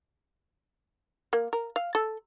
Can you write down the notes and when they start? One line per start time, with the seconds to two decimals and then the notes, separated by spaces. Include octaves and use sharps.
1.33 A#3
1.53 A#4
1.76 F5
1.95 A4